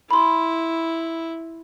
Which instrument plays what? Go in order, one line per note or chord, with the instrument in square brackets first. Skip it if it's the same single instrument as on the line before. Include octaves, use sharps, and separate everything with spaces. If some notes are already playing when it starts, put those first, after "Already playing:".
[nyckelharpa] E4 [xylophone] B5 C6